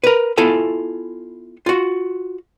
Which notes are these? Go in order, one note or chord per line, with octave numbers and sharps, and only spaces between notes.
A#4 B4
B3 E4 F4 A4 G#5
F4 F#4